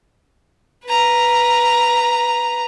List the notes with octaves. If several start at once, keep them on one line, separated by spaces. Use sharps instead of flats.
B4 A#5